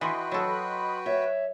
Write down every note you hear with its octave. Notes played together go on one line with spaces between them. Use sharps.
E3 F#4 B4 D#5 G5 B5 C6
F#3 A4
C#5 E5